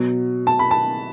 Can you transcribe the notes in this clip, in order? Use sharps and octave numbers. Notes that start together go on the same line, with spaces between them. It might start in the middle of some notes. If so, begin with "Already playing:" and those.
Already playing: B2 F#3
A5
B5
A5